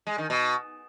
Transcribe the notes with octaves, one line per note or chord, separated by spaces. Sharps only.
G#3
D#3
B2